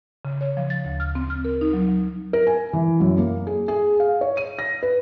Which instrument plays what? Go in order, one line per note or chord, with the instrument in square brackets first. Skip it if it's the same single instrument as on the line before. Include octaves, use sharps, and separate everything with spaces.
[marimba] C#3
C#5
F3
A6
D2
F6
C4
F6
A#4
D#4
F#3
F#3
[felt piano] A#4
G#5
E3
F#2
A#3
G#4
G#4
F5
C#5
D#7
A#6
B4